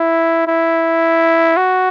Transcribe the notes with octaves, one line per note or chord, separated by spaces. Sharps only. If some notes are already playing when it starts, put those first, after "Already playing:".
Already playing: E4
E4
F#4